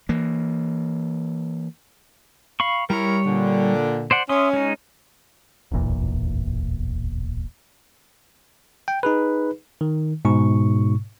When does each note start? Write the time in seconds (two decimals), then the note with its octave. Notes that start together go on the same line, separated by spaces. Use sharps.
0.09 E3 A#3
2.60 F5 B5 C#6
2.90 G3 E4 A#4 C#5
3.25 A#2 D3
4.11 C5 D5 F#5
4.29 C#4 E5 C6 D#6
4.53 G#3 D#4
5.72 D1 G1 E2 A#2
8.88 G5
9.03 D#4 G#4 B4
9.81 D#3
10.25 G#2 B2 C#6